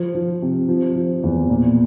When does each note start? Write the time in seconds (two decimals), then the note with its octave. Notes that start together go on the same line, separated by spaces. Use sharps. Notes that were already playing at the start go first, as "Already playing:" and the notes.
Already playing: F3
0.15 F3
0.42 C3
0.69 F3
0.96 F3
1.23 E2
1.50 A#2